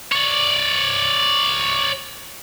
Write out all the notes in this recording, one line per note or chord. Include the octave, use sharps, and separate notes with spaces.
C#5 D5